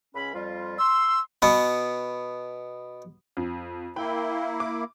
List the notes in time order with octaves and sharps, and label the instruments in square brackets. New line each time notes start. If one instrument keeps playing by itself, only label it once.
[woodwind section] C#2 C#4 B5
F2 G3 F4
[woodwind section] C6 [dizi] E6
[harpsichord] B2 B3
[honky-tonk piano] F2
[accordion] A#3 E4 [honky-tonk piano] G5 B5
[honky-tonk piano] D6